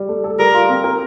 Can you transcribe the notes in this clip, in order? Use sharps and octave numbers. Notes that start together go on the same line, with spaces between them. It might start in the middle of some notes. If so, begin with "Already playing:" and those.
Already playing: G3
A3
A4
G3 A#4
F4
C4
A#4